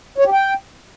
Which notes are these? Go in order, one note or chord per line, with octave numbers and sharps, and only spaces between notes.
C#5
G4
G5